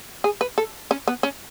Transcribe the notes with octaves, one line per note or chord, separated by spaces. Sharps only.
G#4
B4
A4
C#4
B3
C#4